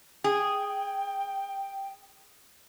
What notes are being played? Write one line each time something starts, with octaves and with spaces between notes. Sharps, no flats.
G#4 G5